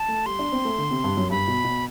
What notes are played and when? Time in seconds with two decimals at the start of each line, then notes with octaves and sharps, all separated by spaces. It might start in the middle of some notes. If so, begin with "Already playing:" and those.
Already playing: A5
0.08 A3
0.26 G3 C6
0.39 D4
0.52 C4
0.65 A3
0.78 D3
0.91 C3
1.04 G2
1.17 F#2
1.30 G2 B5
1.48 B2
1.64 B2